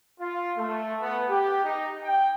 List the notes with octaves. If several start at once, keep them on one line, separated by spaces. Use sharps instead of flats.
F4
A3
B3
G4
D#4
G5